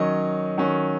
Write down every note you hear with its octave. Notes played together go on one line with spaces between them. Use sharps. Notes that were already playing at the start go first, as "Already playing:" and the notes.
Already playing: D#3 F#3 C#4 D#5
D#3 F#3 C#4